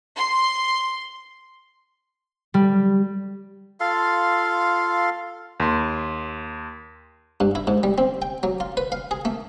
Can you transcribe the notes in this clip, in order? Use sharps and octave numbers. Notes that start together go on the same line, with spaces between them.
C6
G3
F4 A4 F5 C6
D#2 C6
G2
E4
G#2
G3
C4
G5
F#3
F4
B4
F5
G#4
A3